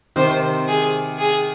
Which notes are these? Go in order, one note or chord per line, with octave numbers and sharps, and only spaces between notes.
C3 D#3 C5
G#4
G#4